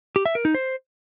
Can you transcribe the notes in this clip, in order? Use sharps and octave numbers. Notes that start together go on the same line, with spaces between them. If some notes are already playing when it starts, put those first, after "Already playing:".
G4
E5
A#4
D#4
C5